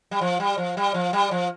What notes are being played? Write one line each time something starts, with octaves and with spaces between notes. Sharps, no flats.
G3
F3
G3
F3
G3
F3
G3
F3